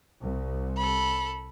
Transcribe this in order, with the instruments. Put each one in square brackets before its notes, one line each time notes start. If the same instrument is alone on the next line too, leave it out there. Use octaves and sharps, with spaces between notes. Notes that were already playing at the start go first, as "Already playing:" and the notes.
[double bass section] C2
[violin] A4 B5